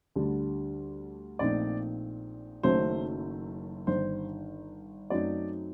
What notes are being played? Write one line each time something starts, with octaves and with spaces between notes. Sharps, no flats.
D2 D3 G3 D4
A#1 A#2 A3 C4 D#4 D5
F#1 F#2 D#3 F#3 A3 C5
G1 G2 D#3 C5
F#2 F#3 A3 C4 D#4 D5